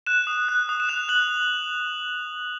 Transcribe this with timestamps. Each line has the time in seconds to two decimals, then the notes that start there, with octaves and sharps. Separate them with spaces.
0.07 F#6 E7
0.27 D#6
0.49 F#6
0.69 D#6
0.80 E7
0.89 F#6 F7
1.09 F#6 F#7